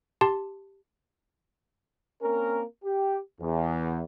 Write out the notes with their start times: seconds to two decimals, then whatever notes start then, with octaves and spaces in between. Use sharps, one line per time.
0.21 G4 A5 C6
2.22 A#3 C4 C#4 A#4
2.84 G4
3.41 E2